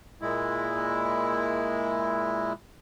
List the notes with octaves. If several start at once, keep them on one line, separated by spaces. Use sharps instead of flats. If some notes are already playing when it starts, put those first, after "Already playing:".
A#2 G#3 E4